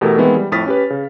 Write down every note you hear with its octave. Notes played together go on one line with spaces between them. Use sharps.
E2 B2 A3 G4 A4 A#4
D#3 E3 G#3 B3 C4 E4
G3
F2 A2 D#6 F6 A6 B6
C#4 G4 B4
C#3